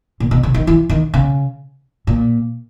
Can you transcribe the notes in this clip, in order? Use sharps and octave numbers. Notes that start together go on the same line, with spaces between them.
A#2
B2
C#3
D#3
E3
D#3
C#3
A#2